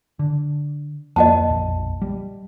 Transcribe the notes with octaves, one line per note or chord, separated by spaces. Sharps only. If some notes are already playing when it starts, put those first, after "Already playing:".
D3
D1 F2 A#3 D#5 F#5 A5
E1 A#1 F2
G3